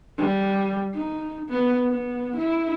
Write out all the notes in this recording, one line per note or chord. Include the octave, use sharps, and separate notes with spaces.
G3
D#4
B3
B3
E4